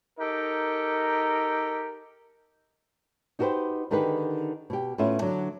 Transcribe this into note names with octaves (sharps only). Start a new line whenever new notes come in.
D#4 G4 A4 A#4
D#4 F#4 G4 A4 B4 C5
D3 D#3 D#4 G4 G#4 B4
B2 G4
A2 B3 C#4 F4 E5
D3 F#3 D4